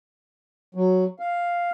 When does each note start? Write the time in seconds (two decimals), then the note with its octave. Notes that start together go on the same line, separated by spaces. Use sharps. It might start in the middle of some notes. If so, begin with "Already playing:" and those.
0.75 F#3
1.19 F5